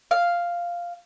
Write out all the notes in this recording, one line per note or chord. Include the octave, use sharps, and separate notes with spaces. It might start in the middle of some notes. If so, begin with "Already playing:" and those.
F5